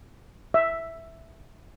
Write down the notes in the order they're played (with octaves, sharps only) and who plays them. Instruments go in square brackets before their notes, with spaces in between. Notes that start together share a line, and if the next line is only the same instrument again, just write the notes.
[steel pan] E5